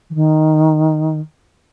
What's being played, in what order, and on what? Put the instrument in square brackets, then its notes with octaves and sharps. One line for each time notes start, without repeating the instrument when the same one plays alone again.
[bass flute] E3
D#3